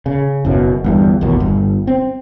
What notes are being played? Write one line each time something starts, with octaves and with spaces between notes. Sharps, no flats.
C#3
F#1 F#2 B2
G1 E2 G2
A1 D#2 B2
G1
C4